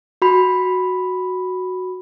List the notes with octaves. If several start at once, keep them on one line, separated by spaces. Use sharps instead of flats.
F#4 B5